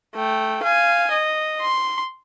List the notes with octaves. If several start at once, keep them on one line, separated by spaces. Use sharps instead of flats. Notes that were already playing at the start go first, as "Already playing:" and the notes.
A3 G5
F5 G#5
D#5
C6